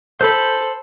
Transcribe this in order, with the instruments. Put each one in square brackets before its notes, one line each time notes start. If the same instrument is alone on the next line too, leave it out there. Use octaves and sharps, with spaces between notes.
[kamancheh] A4 [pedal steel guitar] C5 B5